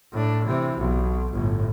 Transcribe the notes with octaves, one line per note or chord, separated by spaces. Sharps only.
A2 D4
C3 E3
B1
G1 A2